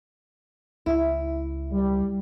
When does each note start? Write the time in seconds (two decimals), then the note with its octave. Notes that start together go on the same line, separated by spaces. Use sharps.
0.86 C#2 E4
1.71 G3